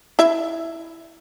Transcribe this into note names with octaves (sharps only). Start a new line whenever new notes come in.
E4 E5